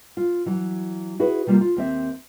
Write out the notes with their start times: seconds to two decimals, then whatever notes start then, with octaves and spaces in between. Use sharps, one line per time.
0.17 F4
0.46 E3 F#3
1.19 E4 F#4 G#4 B4
1.47 C3 G3 A#3 F4
1.61 F4
1.77 D#2 C4 E5